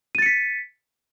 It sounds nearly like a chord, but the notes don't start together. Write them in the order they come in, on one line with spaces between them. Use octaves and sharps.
D#7 A6 C#7 B6